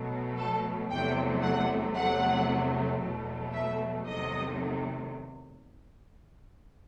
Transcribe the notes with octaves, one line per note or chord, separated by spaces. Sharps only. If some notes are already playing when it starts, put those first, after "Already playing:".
Already playing: B2 F#3 A3
A4
E2 C3 F#3 A3 G5
F#5
E2 C3 F#3 A3 F#5
E2 B2 F#3 A3
E5
E2 C3 D#3 F#3 A3 D#5